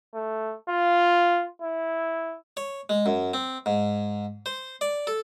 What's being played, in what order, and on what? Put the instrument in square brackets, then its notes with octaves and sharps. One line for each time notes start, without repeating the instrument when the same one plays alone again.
[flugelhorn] A3
F4
E4
[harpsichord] C#5
G#3
F#2
C4
G#2
C5
D5
A4